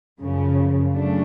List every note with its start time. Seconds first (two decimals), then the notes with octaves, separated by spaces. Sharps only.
0.20 F#2 C#3 F3
0.93 C#3 F#3 A3 D4